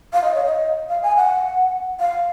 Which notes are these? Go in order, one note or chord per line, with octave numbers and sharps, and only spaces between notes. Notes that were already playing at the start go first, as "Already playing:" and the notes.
F5
D#5
C#5
D#5
F5
G#5
F#5
F5